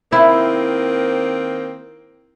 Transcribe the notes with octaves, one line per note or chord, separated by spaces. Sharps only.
D#3 A#3 C4 E4